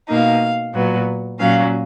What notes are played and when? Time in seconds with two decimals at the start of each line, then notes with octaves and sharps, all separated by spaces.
0.08 B2 A#3 D#4 F5
0.74 A#2 F#3 B3
1.39 A#2 F#3 C#4 F5